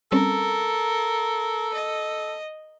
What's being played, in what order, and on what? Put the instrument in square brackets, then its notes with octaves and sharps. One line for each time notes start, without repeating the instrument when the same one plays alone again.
[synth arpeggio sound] G3 C4 C#4 [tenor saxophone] A4 [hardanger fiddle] A#4
[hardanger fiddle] D#5